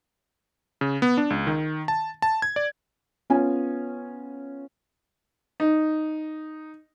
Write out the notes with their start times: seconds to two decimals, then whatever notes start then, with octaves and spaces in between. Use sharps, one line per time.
0.81 C#3
1.02 B3
1.17 D4
1.30 C#2
1.47 D#3
1.88 A5
2.22 A5
2.42 G#6
2.56 D5
3.30 B3 C#4 F4 G#5
5.60 D#4